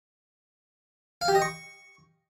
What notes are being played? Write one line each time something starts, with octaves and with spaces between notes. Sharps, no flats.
F5
G4
D#5
C#6